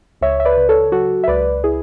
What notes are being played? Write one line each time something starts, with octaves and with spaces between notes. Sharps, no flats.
C#2 C#5 E5
E5
B4 D5
C#3
A4 C#5
F#3 F#4 A4
E5
C#2 B4 D5
E4 G#4